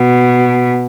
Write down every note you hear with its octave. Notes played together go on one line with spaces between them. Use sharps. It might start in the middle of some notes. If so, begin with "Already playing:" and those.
Already playing: B2